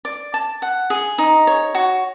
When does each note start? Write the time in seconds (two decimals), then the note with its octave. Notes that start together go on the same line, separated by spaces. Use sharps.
0.05 D5
0.34 A5
0.62 F#5
0.90 G#4
1.18 D#4
1.47 C#5
1.75 F#4